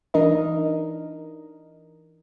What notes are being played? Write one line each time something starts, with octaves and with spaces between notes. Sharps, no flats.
E3 D4 D#4 A#4 D#5